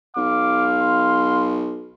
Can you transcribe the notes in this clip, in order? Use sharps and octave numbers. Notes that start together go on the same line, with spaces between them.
B1 F5 D6
C6